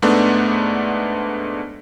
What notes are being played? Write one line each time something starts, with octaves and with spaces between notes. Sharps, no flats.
G#2 A3 B3 D4